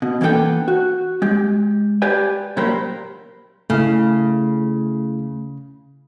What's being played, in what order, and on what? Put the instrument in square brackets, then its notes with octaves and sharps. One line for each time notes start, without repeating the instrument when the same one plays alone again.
[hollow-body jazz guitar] B2
E3 A#3 B3 D4 A4 G5
F#4
G#3 G4
G4 B4 D5 G#5
A#2 F#3 G4 A#4 C5 B5
[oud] C#3 [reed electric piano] A3 E4